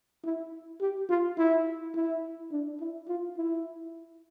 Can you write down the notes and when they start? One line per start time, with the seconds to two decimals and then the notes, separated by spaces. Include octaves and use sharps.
0.24 E4
0.81 G4
1.09 F4
1.38 E4
1.95 E4
2.52 D4
2.81 E4
3.08 F4
3.38 E4